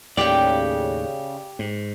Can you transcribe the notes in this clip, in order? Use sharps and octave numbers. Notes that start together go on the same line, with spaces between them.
D#2 A2 C#3 G4 D5 G5
G#2